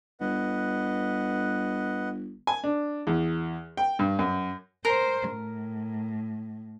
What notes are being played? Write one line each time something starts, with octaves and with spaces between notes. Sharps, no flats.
G1 B4 D#5 F#5
G#5
D4
E2
G5
G2
F#2
A#4 C5
A2